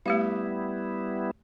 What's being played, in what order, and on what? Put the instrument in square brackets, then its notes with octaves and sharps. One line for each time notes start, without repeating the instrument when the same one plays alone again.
[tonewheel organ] G3 B3 E4 [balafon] A3 G4 F5